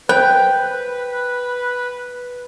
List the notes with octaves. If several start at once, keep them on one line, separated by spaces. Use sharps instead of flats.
B4 C5 G5